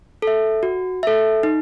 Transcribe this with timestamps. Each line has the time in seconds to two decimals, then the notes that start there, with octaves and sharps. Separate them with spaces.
0.22 A4 E5
0.63 F#4
1.03 A4 E5
1.43 D#4